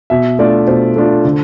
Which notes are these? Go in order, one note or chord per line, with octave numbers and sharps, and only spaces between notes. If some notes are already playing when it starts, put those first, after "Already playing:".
B2 E5
A3 D4 F4 D5
B2 C5
A3 D4 F4
D3